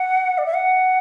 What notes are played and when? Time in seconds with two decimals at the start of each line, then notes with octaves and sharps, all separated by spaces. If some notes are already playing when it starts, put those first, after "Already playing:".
Already playing: F#5
0.38 D5
0.46 E5
0.54 F#5